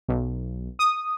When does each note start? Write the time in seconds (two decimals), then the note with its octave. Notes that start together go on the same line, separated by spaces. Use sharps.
0.09 B1
0.79 D#6